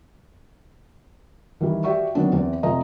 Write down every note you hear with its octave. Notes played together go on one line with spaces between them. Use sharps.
D#3 E3 G3
F#4 G4 D5 E5 C#6
D3 D#3 F#3 B3 C4 D4
E2 E3 C4
F1 F2 A3 F4 D#5 A#5